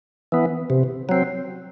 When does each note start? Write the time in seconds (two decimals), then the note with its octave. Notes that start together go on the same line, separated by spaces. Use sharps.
0.32 E3 B3
0.70 C3
1.09 F#3 C4